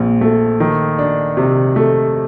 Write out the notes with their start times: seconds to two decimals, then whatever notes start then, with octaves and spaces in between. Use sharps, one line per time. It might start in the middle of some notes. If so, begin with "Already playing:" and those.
Already playing: A#1 A#2 C4
0.21 A3
0.60 D#3
0.99 D4
1.37 C3
1.76 A3